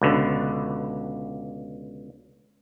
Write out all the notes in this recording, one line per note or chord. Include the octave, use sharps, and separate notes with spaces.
C#2 B2 D3